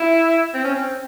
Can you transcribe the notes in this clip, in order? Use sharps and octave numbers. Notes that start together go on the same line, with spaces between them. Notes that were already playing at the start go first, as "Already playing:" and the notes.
Already playing: E4
C4
C#4
C4